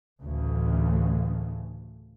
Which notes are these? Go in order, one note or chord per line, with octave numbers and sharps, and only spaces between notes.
A1 D2 C#3